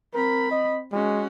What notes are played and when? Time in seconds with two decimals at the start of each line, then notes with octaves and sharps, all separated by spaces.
0.14 C4 A#4 B5
0.51 D#5
0.92 G#3 C#4 F#4